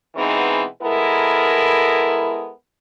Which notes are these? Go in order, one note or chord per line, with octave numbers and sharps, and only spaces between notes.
B2 E3 G#3 B3 C4 D#4
G#3 B3 E4 A4 A#4